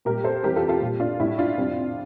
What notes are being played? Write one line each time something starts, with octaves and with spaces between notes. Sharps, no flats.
A#2 G3 G4 A#4
A4 C5
F2 E3 G3 G4 A#4
F4 A4
F4 A4
A#2 G3
D4 F4
A2 G3 E4
D4 F4
F2 C3 G3